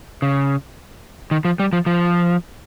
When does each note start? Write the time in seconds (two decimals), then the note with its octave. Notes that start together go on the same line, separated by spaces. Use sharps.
0.22 C#3
1.31 D#3
1.45 F3
1.59 G3
1.73 F3
1.86 F3